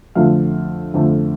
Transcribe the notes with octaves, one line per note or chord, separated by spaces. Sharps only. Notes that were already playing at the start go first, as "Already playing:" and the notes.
F2 D3 F3 A3 F5
F2 D3 F3 A3